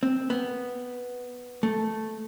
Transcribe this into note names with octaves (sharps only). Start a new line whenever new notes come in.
C4
B3
A3